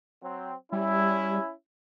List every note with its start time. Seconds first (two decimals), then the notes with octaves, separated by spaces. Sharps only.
0.23 F#3 C4
0.72 G3 C#4 E4